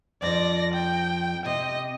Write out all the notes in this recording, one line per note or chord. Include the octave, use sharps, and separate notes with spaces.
F2 F3 D5 A#6
G5
C3 D#5